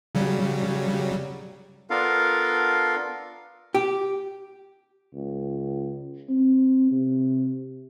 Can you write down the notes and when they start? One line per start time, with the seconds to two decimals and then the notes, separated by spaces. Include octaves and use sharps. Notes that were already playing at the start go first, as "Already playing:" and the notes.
0.15 C#3 F#3 G3
1.90 B3 D4 F4 A4 A#4 F5
3.75 G4
5.14 C#2
6.29 C4
6.91 C3